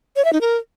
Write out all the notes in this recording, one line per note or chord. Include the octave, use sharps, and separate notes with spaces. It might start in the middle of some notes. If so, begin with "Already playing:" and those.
C#5
E5
D#4
A#4